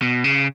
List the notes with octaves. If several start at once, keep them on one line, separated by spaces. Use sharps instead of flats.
B2
C#3